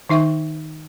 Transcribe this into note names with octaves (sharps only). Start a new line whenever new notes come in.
D#3 D#4 E5 G5 C#6